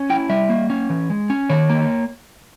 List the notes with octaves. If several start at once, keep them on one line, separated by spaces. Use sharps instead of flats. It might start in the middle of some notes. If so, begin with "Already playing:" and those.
Already playing: C#4
E4 G5
G3 E5
A#3
C#4
E3
G#3
C#4
D#3 C#5
A#3